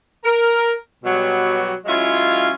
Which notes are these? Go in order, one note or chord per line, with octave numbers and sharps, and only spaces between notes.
A#4
B2 F#3 G3
F#3 G#3 C#4 E4 F4